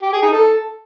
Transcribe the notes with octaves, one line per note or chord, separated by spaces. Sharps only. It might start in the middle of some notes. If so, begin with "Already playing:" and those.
G4
G#4
D#4
A4